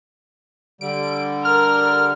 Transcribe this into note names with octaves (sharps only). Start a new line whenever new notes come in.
D3 G3 D7
A#4 F6